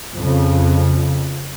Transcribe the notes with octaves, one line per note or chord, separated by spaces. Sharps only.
F2 C#3